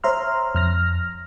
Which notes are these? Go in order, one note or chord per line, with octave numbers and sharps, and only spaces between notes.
C5 C#5 E5 A#5 C6 F6
F2 F6 A#6